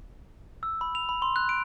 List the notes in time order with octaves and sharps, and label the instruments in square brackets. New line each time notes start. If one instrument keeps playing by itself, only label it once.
[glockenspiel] E6
B5
F7
B5
C6
F#6
D7